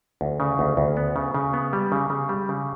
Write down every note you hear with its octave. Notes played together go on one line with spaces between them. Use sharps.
D2
C#3
D2
D2
B3
C#3
C#3
B3
G3
C#3
C#3
G3
C#3